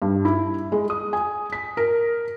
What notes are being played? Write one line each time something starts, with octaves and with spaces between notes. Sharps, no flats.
G2
E4
G#3
D#6
G#5
B6
A#4